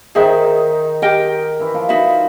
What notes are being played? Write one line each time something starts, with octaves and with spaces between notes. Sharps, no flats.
D#3 D#4 G#4 C5 E5
G4 A#4 D#5 G5
E3 E4
F3 F4
D#4 F#4 B4 E5